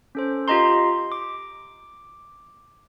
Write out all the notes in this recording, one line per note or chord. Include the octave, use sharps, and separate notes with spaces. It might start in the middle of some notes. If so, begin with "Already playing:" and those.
C#4 A4 C5
F4 G4 D#5 A#5 C6
D6